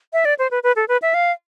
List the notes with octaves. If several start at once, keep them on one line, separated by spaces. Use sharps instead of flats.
E5
D5
C5
B4
B4
A4
B4
E5
F5